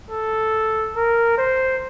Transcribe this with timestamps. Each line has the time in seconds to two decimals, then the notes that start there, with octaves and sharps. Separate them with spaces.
0.11 A4
0.96 A#4
1.38 C5